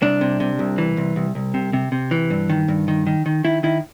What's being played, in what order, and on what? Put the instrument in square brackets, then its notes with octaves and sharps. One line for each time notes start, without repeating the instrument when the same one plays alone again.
[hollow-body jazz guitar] C2 D4
C3
C3
C2
E3
C2
C2
C2
C3
C3
C3
E3
G2
D#3
G2
D#3
D#3
D#3
D#3 E4
D#3 E4